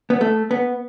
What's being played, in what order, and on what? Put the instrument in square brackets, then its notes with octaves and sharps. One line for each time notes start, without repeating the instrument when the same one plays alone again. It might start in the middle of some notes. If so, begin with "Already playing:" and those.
[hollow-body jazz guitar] B3
A3
B3